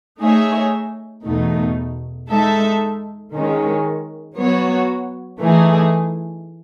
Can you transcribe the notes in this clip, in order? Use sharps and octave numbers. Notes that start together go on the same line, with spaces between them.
A3 D#4 G#4 C#5 E5
E2 B2 A3 D#4
G#3 D#4 A4 E5
D#3 G#3 C#4
F#3 B3 F#4 C#5
E3 A3 D#4 G#4